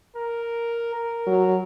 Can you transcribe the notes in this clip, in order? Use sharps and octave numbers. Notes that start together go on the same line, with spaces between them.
A#4
A#4
F#3